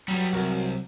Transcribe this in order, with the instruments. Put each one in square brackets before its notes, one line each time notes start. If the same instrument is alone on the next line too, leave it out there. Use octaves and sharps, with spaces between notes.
[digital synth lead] F#3 [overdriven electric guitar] G3 B3
[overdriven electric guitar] C2 [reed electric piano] F#4 A#4